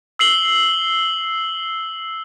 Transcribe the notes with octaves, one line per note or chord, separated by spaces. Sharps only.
E6 C7 F#7 G7